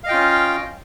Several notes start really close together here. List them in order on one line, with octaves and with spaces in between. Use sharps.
F5 D#5 G5 F4 C#4